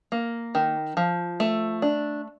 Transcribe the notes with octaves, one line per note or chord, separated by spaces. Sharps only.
A#3
D#3
F3
A3
D4